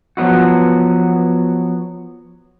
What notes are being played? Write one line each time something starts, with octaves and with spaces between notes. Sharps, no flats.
F3 F#3 B3 E4 F#4